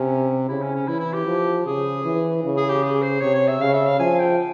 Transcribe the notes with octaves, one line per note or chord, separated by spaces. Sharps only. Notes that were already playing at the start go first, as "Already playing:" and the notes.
Already playing: C3 C#4
C#3 E4
C#4
C#4
E3 E4
E4
G4
F3
C#3 G#4
E3
C#3
G#4
G4
G#4
C5
C3 C#5
C#5
E5
C#3 F5
E5
F5
F3 G#5
G5